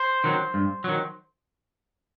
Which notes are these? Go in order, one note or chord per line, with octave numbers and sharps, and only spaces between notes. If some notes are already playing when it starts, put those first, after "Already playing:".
Already playing: C5
D#3 F#3
G2
D#3 F#3